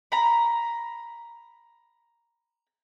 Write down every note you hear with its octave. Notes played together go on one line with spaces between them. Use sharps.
A#5 B5